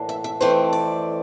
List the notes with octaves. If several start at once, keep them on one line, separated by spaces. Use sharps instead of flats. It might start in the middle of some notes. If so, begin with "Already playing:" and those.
Already playing: A2 E3 A#3 D4
E5
E5
F2 E3 A3 C4 C5
D5